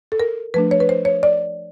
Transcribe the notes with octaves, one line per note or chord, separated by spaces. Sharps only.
A4
A#4
F3 A3 D4 B4
C#5
B4
C5
C#5
D5